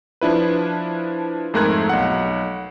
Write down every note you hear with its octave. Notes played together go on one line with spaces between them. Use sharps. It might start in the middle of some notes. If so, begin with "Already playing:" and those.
F3 D4 E4 B4
F2 G#2 A3 A#4 F#6 G#6
B1 F#5